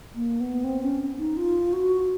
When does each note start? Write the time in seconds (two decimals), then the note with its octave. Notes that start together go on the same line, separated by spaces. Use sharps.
0.15 A#3
0.40 B3
0.64 C4
0.83 C#4
1.18 D#4
1.37 F4
1.73 F#4